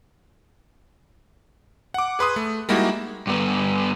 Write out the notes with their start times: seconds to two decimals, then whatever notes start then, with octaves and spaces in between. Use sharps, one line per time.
1.94 F#5 D6
2.19 G#4 B4 C6 D#6
2.36 A3
2.69 G3 G#3 A#3 D#4 E4 F#4
3.27 G2 B3